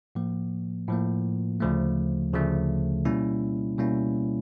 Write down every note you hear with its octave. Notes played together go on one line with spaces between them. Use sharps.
A2 F3 A#3
A2 F3 A#3
D2 C#3 F3 A3
D2 C#3 F3 A3
B2 G3 A#3 C#4 E4
B2 G3 A#3 C#4 E4